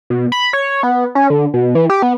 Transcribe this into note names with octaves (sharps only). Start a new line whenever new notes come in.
B2
B5
C#5
B3
C#4
D3
B2
E3
G4
B3